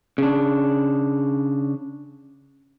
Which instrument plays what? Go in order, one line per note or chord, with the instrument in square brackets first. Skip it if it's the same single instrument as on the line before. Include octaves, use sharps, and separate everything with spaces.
[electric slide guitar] C#3 D4